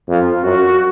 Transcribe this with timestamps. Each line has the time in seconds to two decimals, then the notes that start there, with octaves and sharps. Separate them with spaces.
0.08 F2 F4
0.44 F#2 F#4